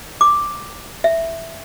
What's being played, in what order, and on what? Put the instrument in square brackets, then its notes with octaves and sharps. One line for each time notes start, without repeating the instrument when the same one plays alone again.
[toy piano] D6
E5